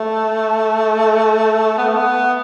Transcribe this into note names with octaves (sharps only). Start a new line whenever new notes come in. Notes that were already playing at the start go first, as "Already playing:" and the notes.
Already playing: A3
B3
A3
B3